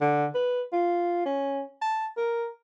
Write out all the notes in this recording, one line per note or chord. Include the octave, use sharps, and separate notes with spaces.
D3
B4
F4
C#4
A5
A#4